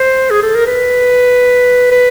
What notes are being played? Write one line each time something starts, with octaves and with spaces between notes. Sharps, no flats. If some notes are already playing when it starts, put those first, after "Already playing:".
Already playing: C5
G#4
A4
A#4
B4
B4